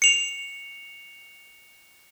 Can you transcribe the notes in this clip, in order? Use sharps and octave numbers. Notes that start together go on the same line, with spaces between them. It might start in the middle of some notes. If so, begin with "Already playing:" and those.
C#7 F7